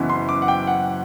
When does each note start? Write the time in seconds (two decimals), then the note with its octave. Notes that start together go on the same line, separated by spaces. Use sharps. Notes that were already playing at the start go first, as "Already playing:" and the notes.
Already playing: F#1 F#2 E3 B3
0.10 C6
0.29 D6
0.42 F#5
0.48 G5
0.67 F#5